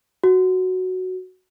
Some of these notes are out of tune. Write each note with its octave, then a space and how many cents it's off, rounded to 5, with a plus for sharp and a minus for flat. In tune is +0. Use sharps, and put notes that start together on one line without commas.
F#4 +0